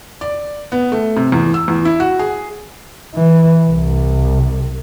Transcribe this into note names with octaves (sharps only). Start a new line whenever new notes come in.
D5
B3
A3
C3
E2
E6
E2
E4
F#4
G#4
E3
C2